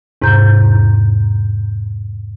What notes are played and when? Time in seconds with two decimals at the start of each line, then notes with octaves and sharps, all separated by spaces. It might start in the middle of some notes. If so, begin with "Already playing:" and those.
0.22 E2 G#2 C3 A#5 G6